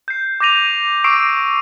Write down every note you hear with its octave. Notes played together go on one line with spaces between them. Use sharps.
G6 C7
D6 G6 A#6 D#7 F7
C#6 D6 E6 C7 D7